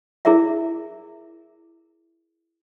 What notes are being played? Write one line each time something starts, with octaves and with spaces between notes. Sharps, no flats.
E4 G#4 A#4 D5 E5